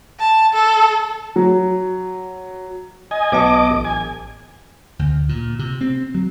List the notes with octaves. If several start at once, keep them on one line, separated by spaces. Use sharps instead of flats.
A5
A4
F#3
D#5 G#5
B1 B3 D#5 A5 D6
A1
G#5
D2
A#2
C3
C4
F#3